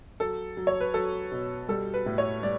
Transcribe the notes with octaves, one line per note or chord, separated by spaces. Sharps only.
F#3 A4
F#3
C#5
B4
F#3 A4
B2
G3 A4
B4
A2
C#5
G3 D5